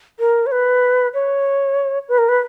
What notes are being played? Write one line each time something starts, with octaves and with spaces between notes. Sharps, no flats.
A#4
C#5
B4
C#5
B4
A#4
B4